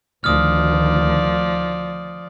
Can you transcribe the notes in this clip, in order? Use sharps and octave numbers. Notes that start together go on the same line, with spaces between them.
D2 D#3 F3 D5 D#6 F6